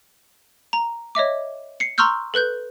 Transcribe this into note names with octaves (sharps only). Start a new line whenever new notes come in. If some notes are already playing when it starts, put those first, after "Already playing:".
A#5
C#5 D#5 E5 D6
C7 C#7
A#5 C6 C#6 E6 F6 G6
A4 B4 F#6 G6